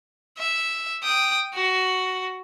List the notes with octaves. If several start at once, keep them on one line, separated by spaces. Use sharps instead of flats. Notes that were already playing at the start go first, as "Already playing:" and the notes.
E5
G5 D#6
F#4